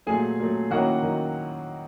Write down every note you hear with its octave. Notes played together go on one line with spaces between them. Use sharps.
A#2 F#3 A3 G#4 G#5
A#2 F#3 A3
D#3 F#3 A#3 C#4 E4 F#4 F#5
D#3 F#3